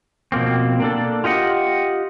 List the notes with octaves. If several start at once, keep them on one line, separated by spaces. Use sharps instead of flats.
B2 F3 A#3 C4
A#3 D4 A4
F4 G4 D#5 F#5